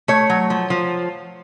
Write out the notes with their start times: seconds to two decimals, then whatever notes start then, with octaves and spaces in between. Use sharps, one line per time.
0.08 A3 C#5
0.30 F#3
0.50 F3
0.70 F3